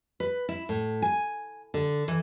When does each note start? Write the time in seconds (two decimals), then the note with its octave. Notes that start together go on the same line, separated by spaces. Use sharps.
0.20 B4
0.49 E4
0.69 A2
1.02 G#5
1.74 D3
2.08 E3